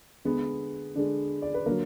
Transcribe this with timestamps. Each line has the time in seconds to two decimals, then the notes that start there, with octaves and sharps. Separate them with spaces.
0.25 D3 G#3 B3
0.95 D3 G#3 D4
1.42 D5
1.54 B4
1.66 D3 F#3 A#3 A#4